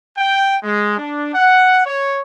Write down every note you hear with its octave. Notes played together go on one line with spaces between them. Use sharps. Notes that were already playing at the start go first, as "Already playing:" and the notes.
G5
G#3
D4
F#5
C#5